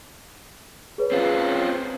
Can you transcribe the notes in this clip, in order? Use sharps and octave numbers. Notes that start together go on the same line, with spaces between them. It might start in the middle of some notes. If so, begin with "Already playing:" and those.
G#4 B4 C#5
C4 C#4 F4